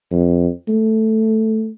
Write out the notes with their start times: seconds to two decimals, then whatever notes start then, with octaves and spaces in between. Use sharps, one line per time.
0.11 F2
0.68 A3